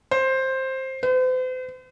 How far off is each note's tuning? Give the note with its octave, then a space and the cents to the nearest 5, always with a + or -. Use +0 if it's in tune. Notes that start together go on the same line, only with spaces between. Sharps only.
C5 +10
C5 -45